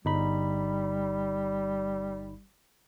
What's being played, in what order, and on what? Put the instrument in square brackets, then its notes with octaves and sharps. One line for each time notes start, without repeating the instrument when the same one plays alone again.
[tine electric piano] G1 D#4 B5 [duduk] G3